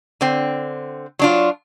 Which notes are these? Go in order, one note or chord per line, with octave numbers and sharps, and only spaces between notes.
D3 C4
F#3 D4 F4